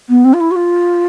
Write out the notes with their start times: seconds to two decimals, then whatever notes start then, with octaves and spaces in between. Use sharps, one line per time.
0.09 B3
0.25 C4
0.34 F4
0.40 E4
0.51 F#4
0.56 F4